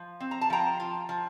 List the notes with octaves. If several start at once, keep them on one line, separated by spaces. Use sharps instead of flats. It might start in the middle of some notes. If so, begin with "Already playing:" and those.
Already playing: F3
C4
A#5
A5
F3 G5 A#5
F4
F3